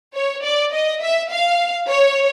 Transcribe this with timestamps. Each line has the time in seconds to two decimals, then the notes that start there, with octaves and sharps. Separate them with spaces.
0.16 C#5
0.44 D5
0.74 D#5
1.02 E5
1.32 F5
1.89 C#5